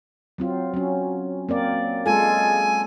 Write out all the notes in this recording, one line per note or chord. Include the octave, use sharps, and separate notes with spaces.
F#3 C4 F4
F#3 C#4
A#3 C4 D5
G#3 F4 A4 G#5